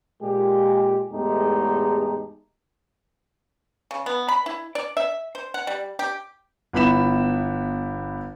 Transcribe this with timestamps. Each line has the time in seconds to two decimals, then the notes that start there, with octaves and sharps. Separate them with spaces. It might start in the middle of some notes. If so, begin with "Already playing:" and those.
0.21 A#2 G#3 G4
1.12 E2 A2 G#3 A3 D#4 G4
3.91 C#3
4.06 B3
4.28 B5
4.46 E4
4.75 D5
4.97 E5
5.35 C5
5.54 F#5
5.67 G3
5.99 G4
6.73 G1 B3 E4 B5 E7